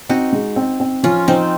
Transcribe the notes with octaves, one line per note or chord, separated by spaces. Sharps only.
C4 D#4 F#4
G#3
C4
C4
F3 C#4 F4
F3 C4 D#4